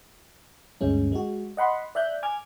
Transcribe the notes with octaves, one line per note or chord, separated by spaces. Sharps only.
D2 G2 G#3 C#4
G#3 F#4
D#5 F#5 B5 C6
D5 E5 F#6 G6
G#5 D6 F6 G#6